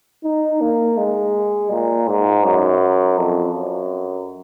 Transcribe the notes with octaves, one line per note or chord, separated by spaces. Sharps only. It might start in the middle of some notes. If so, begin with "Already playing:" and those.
D#4
A#3
G#3
A#2
G#2
F#2
F2
F#2